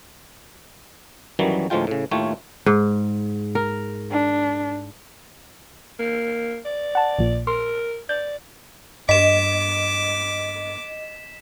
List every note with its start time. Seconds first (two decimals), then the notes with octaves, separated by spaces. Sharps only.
1.39 F#2 D#3 E3 F#3 G3
1.70 D2 A2 F3 G#3 F4 G5
1.87 A2 C#3
2.11 D#2 A2 A3 F4 C#5 G5
2.66 G#2
3.55 A#4
4.11 D4
5.99 A#3
6.65 D5
6.95 F#5 A5
7.19 A#1 A#2
7.47 A#4 C6
8.09 D5 G6
9.09 G2 D#5 D6 B6 E7